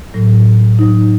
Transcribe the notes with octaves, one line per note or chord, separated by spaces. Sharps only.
A2 F#3
A2 F#3 D#4